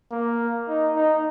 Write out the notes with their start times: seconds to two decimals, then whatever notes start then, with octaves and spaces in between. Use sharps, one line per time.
0.11 A#3
0.68 D#4
0.96 D#4